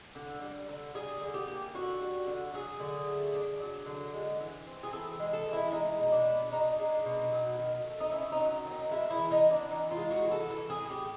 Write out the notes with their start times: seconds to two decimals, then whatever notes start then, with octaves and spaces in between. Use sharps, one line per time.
0.15 D3
0.41 G3
0.69 D3
0.94 G3 G#4
1.21 D3
1.34 G4
1.48 A#3
1.74 D3 F#4
2.01 G3
2.27 D3
2.53 F#3 G#4
2.80 D3
3.07 A3
3.34 D4
3.60 F#3
3.86 D3
4.13 G#3
4.39 E3
4.67 C4
4.83 G#4
4.92 E3 A4
5.19 G#3
5.33 A4
5.46 E3
5.53 E4
5.72 G#3 D#4
6.00 B2
6.12 D4
6.26 B3
6.52 D4 D#4
6.79 G#3
7.05 B2
7.32 F#3
7.59 D#3
7.86 A3
8.00 D#4
8.11 C#4 E4
8.32 D#4
8.38 F#3
8.64 D#3
8.71 D#4
8.91 G#3 E4
9.10 E4
9.18 E3
9.31 D#4
9.44 B3
9.51 D4
9.71 E3 D#4
9.91 F4
9.97 G#3
10.11 F#4
10.24 E3
10.31 A4
10.49 E3 A4
10.70 G#4
10.76 A2
10.90 G4